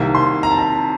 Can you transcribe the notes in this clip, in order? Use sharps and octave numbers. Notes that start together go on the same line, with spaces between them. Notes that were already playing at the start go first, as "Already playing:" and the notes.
Already playing: C2 C3 D#3 A#3
C6
A#5
A5
A#5